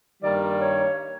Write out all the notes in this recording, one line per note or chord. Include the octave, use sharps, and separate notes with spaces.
G2 D#3 G3 A#3 D5
C#5